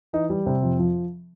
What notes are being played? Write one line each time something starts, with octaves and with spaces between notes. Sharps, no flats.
E3 D#4
G3
C3 C4
F2
F3